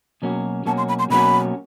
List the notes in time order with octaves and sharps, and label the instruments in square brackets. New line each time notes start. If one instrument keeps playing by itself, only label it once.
[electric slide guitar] B2 F#3 A#3 C#4 F#4
[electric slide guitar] B2 F#3 A#3 C#4 F#4 [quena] A5
[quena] C6
B5
C6
[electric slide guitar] B2 F#3 A#3 C#4 F#4 [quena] B5